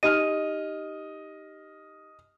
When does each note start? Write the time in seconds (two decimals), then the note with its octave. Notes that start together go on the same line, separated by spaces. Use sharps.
0.03 D#4 G4 D#5 F6 D#7